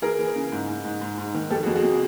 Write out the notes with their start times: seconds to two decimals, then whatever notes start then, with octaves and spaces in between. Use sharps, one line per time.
0.02 E3 G#4 A#4
0.19 E3
0.35 C#3
0.52 G#2
0.68 G#2
0.85 G#2
1.01 G#2
1.18 G#2
1.34 D#3
1.50 F2 G4 A4
1.63 F#4 G#4
1.67 F2
1.75 F#4 G#4
1.84 C3